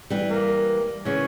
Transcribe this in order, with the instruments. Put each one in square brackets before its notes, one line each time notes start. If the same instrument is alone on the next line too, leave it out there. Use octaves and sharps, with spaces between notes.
[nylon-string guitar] E3 G3
[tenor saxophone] A#3
[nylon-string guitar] C#3 E3 [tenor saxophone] C#4